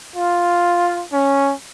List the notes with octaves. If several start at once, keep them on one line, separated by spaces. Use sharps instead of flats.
F4
C#4